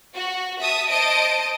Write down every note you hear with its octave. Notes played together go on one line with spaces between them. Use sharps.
F#4
E5 A5 D#6
C5 D#5 A5 D7